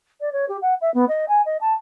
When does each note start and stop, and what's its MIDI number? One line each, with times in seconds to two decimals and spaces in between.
0.21 0.32 74
0.32 0.45 73
0.48 0.57 67
0.62 0.74 78
0.81 0.92 76
0.94 1.05 59
1.08 1.25 75
1.28 1.41 80
1.45 1.57 75
1.61 1.73 81